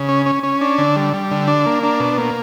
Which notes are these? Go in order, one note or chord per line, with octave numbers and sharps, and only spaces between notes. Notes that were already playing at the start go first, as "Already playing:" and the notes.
Already playing: C#3
C#4
C#4
C#4
D4
D3
G3
G3
D3
D4
A#3
D4
B2
A#3